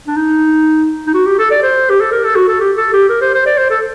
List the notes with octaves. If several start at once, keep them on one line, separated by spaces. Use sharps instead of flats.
D4
D#4
D#4
F#4
G4
A4
D5
C5
G4
A4
A#4
A4
F#4
A4
G4
A4
G4
A#4
C5
C5
D5
C5
A4